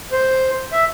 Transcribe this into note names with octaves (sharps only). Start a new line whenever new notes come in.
C5
E5